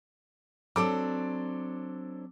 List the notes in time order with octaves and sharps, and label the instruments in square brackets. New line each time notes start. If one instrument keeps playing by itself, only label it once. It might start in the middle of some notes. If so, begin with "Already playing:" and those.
[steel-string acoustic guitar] F#3 C4 D4 [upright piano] A4 D6